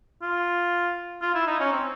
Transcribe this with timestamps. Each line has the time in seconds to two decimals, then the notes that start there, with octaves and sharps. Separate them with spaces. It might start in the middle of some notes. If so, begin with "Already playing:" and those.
0.22 F4
1.21 F4
1.34 E4
1.47 D#4
1.60 C#4
1.72 C4